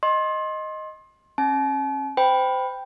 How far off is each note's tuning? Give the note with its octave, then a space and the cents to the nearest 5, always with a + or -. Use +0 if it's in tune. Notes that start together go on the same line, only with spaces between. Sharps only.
D#5 +0 C6 +25
C#4 -40 A5 -45
C5 -25 G5 +0 B5 +0